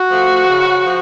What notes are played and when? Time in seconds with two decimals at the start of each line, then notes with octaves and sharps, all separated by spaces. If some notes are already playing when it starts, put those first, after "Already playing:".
Already playing: F#4
0.11 F3 A3
0.49 C#3
0.85 F3